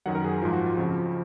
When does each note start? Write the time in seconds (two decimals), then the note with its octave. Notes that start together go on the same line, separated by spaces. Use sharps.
0.06 F#2 D#3 F#3 F#5
0.15 A#4
0.24 G#4
0.42 G#2 F3 F4
0.53 F#4
0.66 F4
0.77 F2 C#3 F3 F#4